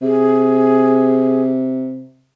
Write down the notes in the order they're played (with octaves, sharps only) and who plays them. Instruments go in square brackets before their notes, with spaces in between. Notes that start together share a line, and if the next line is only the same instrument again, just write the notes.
[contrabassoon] C3 [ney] G#4